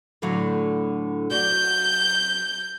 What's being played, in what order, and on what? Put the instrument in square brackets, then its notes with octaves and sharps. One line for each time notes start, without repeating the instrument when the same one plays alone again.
[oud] A2 D3 F#3
[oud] F#3 F#4 D5 [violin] G6